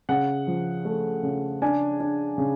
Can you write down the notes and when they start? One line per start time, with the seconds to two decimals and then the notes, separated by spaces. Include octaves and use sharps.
0.09 C#3 F#5
0.47 F3
0.85 A3
1.23 C#3
1.62 D4 G#5
2.00 D4
2.38 C#3